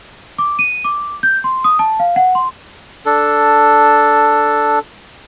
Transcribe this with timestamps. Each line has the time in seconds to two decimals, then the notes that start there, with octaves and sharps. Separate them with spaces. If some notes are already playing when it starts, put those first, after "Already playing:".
0.38 D6
0.59 D#7
0.84 D6
1.23 G6
1.44 C6
1.64 D#6
1.79 A5
2.00 F5
2.16 F#5
2.35 C6
3.06 D4 A4